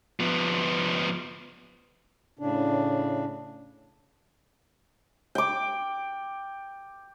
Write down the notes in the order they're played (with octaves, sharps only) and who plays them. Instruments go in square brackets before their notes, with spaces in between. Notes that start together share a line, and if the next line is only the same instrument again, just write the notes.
[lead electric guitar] F3 B3
[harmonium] A2 C#3 D4
[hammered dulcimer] G5 D6